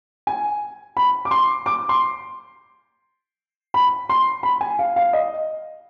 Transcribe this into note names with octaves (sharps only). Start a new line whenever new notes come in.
G#5
B5
D6
C6
D6
C6
B5
C6
B5
G#5
F5
F5
D#5